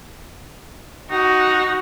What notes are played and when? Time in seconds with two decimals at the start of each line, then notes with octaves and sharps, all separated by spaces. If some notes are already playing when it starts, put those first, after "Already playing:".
1.11 D#4 F#4